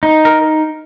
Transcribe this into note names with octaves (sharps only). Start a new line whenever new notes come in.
D#4
A#4